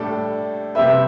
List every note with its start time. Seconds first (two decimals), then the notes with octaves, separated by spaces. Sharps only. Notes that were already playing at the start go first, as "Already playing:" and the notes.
Already playing: A2 G3 D4 A4
0.75 C3 G3 C4 G4 B4 E5